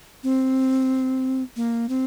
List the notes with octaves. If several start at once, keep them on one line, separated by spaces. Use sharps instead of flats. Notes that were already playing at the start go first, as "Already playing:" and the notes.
C4
A#3
C4